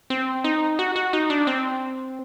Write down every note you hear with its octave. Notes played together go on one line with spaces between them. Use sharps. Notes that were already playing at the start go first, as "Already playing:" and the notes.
C4
D#4
F#4
F#4
D#4
D4
C4